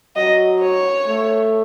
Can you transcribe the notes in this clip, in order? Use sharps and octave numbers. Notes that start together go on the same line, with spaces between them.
F#3 D#5
C#5
A3